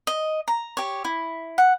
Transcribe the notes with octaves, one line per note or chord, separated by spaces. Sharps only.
D#5
A#5
G4 C#5
E4
F#5